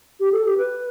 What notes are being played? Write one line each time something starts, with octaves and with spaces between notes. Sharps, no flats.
G4
A4
G4
B4